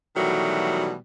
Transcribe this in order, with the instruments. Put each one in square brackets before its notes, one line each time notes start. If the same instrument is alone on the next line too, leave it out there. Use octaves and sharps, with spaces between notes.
[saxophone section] B2 D#3 E3 F#3 G3 A3